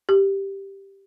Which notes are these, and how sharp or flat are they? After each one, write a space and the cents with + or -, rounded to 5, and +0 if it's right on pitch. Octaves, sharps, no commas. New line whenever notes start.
G4 +0